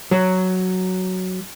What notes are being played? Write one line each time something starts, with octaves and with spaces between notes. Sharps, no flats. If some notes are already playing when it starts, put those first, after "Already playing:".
F#3